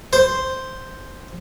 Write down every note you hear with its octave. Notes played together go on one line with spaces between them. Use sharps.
C5